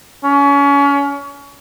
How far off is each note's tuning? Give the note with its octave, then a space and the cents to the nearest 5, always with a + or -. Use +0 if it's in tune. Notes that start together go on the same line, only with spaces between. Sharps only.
C#4 +30